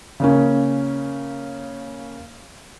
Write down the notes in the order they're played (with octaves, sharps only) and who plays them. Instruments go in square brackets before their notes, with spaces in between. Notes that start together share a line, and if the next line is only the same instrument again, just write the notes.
[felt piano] C#3 A#3 C#4